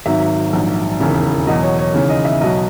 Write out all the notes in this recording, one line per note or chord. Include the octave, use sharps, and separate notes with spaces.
G#1 G#2 F#3 E5
A#1 G#2 D#3 F#3
E1 D#2 C#3 E3
E2 B2 F#3 D#5
C#5
C#5
D#2 C#3 E3 C#5
D#5
E5
B1 B2 F#3 D#5